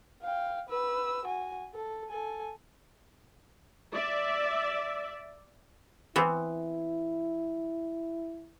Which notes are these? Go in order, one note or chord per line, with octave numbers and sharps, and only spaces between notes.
F5 G5
B4 E6
F#4 G#5
A4
A4 G#5
D5 E5
E3 B3 C4 E4